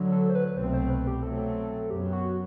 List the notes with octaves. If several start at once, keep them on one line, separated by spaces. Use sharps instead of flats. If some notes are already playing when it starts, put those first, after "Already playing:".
Already playing: D2 D3 F#3
A4
C5
B4
C2 B2 A3 C4 C5
C5
B4
G4
B2 F#3 A3 C4 A4
F#2 F#3 B3 G4
F#4